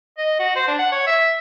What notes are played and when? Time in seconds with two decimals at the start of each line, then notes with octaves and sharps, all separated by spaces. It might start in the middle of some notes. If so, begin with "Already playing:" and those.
0.18 D#5
0.39 F#4
0.56 C5
0.68 D4
0.79 F#5
0.92 C#5
1.07 E5